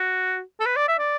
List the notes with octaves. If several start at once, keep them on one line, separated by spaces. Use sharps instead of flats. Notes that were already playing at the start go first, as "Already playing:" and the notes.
Already playing: F#4
A4
B4
D5
E5
D5